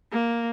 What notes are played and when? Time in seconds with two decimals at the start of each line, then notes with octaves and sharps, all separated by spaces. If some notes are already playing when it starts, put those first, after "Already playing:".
0.12 A#3